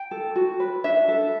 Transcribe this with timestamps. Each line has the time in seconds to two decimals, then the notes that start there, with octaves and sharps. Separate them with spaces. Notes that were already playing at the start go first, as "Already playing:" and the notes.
Already playing: G5
0.11 A4
0.36 F#4
0.60 B4
0.84 D4 E5
1.08 A4